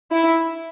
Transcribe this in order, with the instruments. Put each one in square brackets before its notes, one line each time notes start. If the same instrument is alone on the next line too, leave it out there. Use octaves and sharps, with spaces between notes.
[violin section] E4